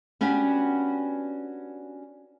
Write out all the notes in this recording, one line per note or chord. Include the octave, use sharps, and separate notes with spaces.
B3 C#4 D4 F#4 G4